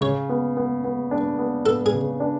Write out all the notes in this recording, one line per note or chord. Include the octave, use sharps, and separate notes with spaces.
C#3 C#5
B3
B3
B3
D4
B3
B3 A4
G#4
C#3
D4